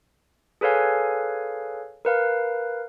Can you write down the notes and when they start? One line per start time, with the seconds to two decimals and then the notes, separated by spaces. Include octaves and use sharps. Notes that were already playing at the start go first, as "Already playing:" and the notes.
0.61 G#4 A4 B4 C#5 F5 G#5
2.05 A#4 B4 F5